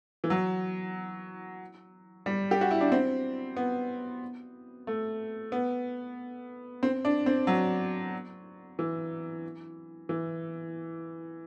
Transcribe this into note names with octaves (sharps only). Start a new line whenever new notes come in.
E3
F#3
G3
G4
F#4
E4
D4
C4
B3
A3
B3
C4
D4
C4
F#3
E3
E3